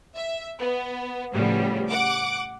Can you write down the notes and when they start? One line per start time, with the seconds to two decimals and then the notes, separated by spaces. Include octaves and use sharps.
0.17 E5
0.59 B3
1.33 A2 C#3 F3 G3 B3
1.89 F#5 D6